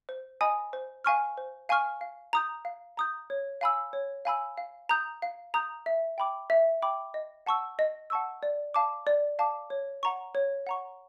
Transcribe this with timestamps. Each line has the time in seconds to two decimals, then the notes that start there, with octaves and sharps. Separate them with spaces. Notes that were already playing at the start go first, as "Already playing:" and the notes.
0.09 C5
0.41 D#5 G#5 B5 D#6
0.73 C5
1.04 F5 G#5 C#6 F6
1.37 C5
1.69 F5 G#5 C#6 F6
2.01 F5
2.33 A#5 D#6 G6
2.65 F5
2.97 A#5 D#6 G6
3.30 C#5
3.61 F5 G#5 B5 E6
3.93 C#5
4.25 F5 G#5 B5 E6
4.58 F5
4.89 A#5 D#6 G6
5.22 F5
5.54 A#5 D#6 G6
5.86 E5
6.18 G5 B5 D6
6.50 E5
6.82 G5 B5 D6
7.14 D#5
7.46 F#5 A5 C#6 E6
7.79 D#5
8.10 F#5 A5 C#6 E6
8.43 D5
8.74 F5 A5 D6
9.07 D5
9.39 F5 A5 D6
9.70 C#5
10.03 F#5 A#5 C#6
10.35 C#5
10.67 F#5 A#5 C#6